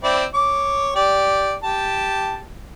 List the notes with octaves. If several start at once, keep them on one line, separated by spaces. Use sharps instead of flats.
C4 E4 D5
C#5 D6
G4 D5
G4 A5